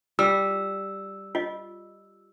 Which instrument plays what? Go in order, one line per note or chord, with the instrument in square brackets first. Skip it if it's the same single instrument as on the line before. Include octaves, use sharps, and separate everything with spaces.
[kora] G3 [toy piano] F4 [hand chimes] E6
[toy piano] F4 D#5